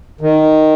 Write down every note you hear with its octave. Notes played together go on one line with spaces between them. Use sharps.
D#3